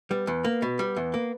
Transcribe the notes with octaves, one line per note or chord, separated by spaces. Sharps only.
G3 B3
E2 B3
A#3
B2
G3
E2
A#3